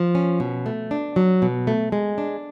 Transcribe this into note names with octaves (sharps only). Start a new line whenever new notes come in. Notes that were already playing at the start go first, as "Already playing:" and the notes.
Already playing: F3
C#4
B2
A3
D4
F#3
B2
A3
G#3
D4